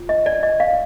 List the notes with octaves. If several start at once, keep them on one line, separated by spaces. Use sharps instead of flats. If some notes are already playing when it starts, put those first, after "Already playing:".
Already playing: F4
D#5
D5
D#5
F5